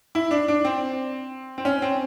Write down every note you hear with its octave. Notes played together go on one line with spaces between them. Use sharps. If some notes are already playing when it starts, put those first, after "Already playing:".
E4
D4
D4
C4
C4
C#4
C4